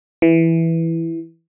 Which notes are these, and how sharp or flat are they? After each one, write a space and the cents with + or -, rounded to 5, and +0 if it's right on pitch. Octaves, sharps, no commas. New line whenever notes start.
E3 +0